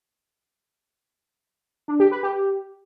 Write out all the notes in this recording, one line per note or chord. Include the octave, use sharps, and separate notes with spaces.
D4
G4
B4
G4